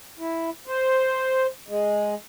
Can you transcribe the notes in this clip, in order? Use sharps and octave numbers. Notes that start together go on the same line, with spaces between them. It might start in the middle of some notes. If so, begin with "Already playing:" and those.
E4
C5
G#3